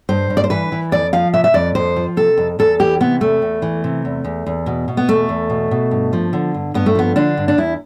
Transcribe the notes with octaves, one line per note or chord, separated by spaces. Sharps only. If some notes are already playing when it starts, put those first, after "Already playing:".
G2 C5
G2
D5
C5
E3 B4
E3
F2 D5
F3 F5
C3 E5
E5
F2 D5
F2 C5
F3
C3 A4
F2
E2 A4
E3 G4
C3 B3
E2 A3
E2
E3
C3
E2
E2
E2
B2
B2
B3
E2 A3
E2
B2
B2
G2
F3
D3
G2
G2 B3
A3
F3 B3
D3 D4
G2
D4
E2 E4